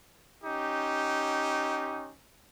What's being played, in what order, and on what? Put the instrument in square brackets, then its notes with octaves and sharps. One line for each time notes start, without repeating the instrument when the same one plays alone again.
[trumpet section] C#4 D#4 G4